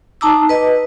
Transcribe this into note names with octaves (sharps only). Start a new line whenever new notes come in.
D#4 A5 A#5 D6 E6
B4 D#5